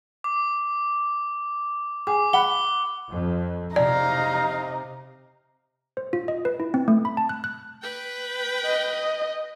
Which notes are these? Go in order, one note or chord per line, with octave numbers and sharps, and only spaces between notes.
D6
G#4 D6
F#5 B5 G7
F2
C3 D#4 D5 F5 A#5
C5
F4
D#5
B4
E4
C4
A3
B5
A5
F#6
F#6
B4 G5
D#5